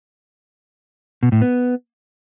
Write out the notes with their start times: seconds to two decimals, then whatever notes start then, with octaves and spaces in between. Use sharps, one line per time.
1.23 B2
1.32 A2
1.42 B3